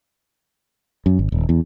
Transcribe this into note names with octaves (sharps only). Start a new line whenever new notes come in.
F#2
G#1
D#1
E2